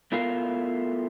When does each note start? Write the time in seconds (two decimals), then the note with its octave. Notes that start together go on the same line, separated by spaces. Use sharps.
0.12 A3 B3 E4 F4 A#4 F5